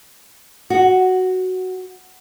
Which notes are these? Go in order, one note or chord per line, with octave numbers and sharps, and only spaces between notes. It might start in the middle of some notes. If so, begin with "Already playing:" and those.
F#4